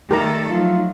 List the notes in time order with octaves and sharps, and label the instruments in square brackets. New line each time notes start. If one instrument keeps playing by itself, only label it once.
[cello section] D#3 G3 A4 [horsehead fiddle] A3 D#4 [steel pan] G4 A#4 A#5
[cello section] F3 F#3 [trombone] F4